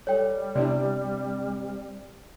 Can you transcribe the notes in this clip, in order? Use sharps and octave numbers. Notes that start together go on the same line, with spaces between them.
G3 A4 C#5 G5
C3 B3 D4 E4 G4 D5